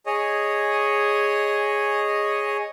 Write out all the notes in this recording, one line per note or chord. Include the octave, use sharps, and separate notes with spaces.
G#4 C#5 D#5